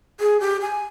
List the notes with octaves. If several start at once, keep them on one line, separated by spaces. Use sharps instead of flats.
G#4
G4
G#5